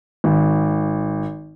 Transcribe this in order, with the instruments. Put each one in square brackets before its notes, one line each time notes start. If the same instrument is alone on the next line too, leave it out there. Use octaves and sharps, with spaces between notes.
[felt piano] G#1